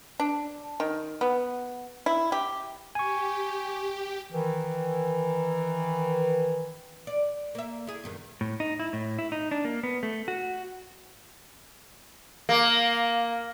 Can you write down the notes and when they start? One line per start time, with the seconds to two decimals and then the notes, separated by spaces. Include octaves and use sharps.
0.20 D4
0.80 D#3
1.21 B3
2.06 E4
2.32 G4
2.95 G4 G#5 C#6
4.31 D#3 E3
7.07 D5
7.55 A#3 E5
7.87 E4 G#4
8.04 E2 G2 D#3
8.41 A2
8.60 D#4
8.80 E4
8.93 A2
9.19 E4
9.32 D#4
9.51 D4
9.65 A#3
9.83 B3
10.03 A3
10.28 F#4
12.49 A#3